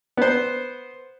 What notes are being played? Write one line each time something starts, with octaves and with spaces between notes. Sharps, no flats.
B3 C5